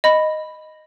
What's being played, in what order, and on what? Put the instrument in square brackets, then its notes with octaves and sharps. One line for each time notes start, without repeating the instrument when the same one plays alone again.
[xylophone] D#5 B5